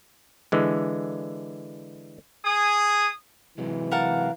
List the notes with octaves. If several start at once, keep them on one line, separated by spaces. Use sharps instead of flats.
D3 E3 G#3
G#4 G#5 D#6
C3 E3 F#3 G#3
A#4 F5 F#5 A5